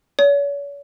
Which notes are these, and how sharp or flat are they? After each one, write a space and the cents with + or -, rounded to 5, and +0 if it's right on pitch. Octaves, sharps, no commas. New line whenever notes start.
C#5 +40